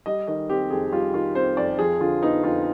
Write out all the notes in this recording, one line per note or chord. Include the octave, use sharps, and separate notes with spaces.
G3 D#5
D#3 D#5
C4 G4
F2 G#4
G3 F4
D#3 F4
C4 C5
F2 D5
F3 G#4
D3 F4
B3 D#4
F2 F4